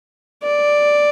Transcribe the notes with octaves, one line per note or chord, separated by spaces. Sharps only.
D5